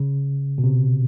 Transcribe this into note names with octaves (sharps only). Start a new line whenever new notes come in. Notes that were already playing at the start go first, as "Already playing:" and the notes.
Already playing: C#3
B2
C3